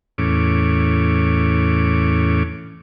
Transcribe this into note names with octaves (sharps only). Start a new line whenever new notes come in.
E2 A2 C#4 D6